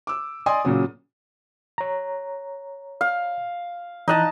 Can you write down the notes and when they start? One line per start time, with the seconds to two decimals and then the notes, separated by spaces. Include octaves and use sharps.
0.07 D6 E6
0.46 D5 D#5 G#5 C6 D#6
0.65 A#2 C#3 F#3
1.78 C#5 A#5
3.01 F5
4.08 E3 D#4 D#5 A5 F#6